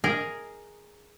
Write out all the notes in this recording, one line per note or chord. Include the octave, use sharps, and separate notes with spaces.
G#4 A#4 D#5